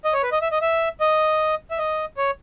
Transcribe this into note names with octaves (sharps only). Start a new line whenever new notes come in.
D#5
C#5
B4
D#5
E5
D#5
E5
D#5
E5
D#5
C#5